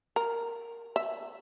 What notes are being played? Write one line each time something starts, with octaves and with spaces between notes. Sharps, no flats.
A#4
E5